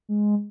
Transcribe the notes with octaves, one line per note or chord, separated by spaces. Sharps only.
G#3